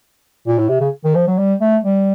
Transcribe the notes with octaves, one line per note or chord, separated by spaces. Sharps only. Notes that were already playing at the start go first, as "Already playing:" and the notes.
A#2
A2
C3
C#3
D#3
F3
F#3
G3
A3
G3